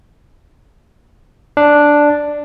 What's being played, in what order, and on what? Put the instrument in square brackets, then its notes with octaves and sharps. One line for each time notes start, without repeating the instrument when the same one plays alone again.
[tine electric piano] D4